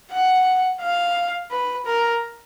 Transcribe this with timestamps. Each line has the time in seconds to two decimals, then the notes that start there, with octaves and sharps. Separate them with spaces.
0.12 F#5
0.81 F5
1.51 B4
1.86 A#4